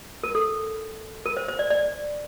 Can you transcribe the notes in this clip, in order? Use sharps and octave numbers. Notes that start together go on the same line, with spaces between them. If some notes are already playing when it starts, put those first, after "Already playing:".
A#4
A4
A#4
C5
C5
D5
D5